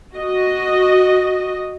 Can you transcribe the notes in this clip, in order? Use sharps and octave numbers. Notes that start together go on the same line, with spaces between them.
F#4 D#5